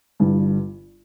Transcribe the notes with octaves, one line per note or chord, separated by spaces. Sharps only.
G1 G2 E3